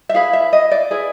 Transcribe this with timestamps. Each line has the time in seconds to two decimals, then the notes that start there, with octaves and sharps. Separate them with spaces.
0.09 E5
0.14 E4 G#4 B4 F5
0.33 E5
0.53 D#5
0.71 D5
0.91 E4 G#4 B4